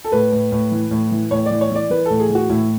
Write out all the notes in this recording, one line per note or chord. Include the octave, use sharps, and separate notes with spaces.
A4
A2 B4
A2
A2
E3
A2
E3
A2 C#5
D5
E3
C#5
E3 D5
E3 B4
A2 A4
G#4
E3
F#4
A2 E4